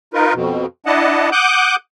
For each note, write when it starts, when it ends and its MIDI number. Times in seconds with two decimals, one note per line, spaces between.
0.14 0.33 63
0.14 0.33 65
0.14 0.33 70
0.14 0.33 71
0.34 0.66 41
0.34 0.66 47
0.86 1.30 62
0.86 1.30 64
0.86 1.30 75
0.86 1.30 78
0.86 1.30 81
1.32 1.76 78
1.32 1.76 86
1.32 1.76 87
1.32 1.76 90
1.32 1.76 91